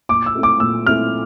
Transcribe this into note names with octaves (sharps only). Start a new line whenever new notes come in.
A#2 D6
E6
A3 C4 E4
D6
A#2 E6
A3 C4 E4 F6